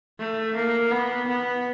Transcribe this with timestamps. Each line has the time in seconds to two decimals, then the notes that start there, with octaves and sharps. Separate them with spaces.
0.20 A3
0.55 A#3
0.92 B3
1.28 B3